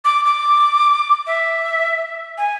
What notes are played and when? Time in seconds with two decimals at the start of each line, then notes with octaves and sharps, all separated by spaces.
0.05 D6
0.26 D6
1.27 E5
2.38 G#5